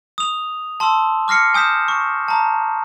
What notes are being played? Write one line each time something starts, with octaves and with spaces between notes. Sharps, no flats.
D#6 F7
A5 C6 D#6 E6
D6 F6 A#6 C7 C#7
G#5 D#6 G6 B6 E7
C#6
A5 A#5